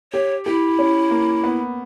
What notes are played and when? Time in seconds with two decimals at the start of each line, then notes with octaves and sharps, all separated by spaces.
0.13 G4 C#5
0.46 E4 G4
0.79 C#4
1.11 A#3
1.44 B3